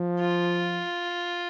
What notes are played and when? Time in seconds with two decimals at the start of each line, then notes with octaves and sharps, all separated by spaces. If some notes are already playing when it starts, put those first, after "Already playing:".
Already playing: F3
0.20 F4